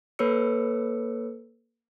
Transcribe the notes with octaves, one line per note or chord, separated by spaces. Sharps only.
A#3 A4 B4 C#5 E6 C#7